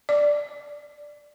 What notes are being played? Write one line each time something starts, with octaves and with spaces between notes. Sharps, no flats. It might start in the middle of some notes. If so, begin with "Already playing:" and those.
D5